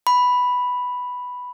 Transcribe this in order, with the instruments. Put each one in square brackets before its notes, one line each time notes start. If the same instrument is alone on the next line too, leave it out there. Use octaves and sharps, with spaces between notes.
[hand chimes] B5